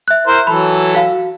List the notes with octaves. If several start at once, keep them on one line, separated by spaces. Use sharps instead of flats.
E5 F#6
E4 A#4 C5
E3 F#3 A4 B5
F#4 F5